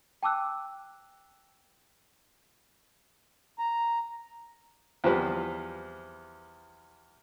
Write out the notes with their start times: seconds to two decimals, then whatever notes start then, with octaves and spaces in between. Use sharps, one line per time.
0.23 G5 A5 D6 E6 F#6
3.59 A#5
5.04 E2 F3 G3 C4 B4 C5